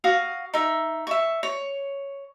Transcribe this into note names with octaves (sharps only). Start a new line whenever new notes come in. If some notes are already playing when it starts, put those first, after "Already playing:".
F#4 F5 D#6
D#4 E5
E5 C#6
C#5